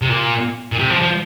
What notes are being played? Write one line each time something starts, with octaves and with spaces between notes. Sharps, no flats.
C3
A#2
A#2
C3
F3
F3